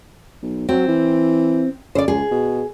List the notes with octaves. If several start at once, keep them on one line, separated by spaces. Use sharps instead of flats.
B1
F#3 C4
E3
C#3 C5 D5
C#2 G#4
B2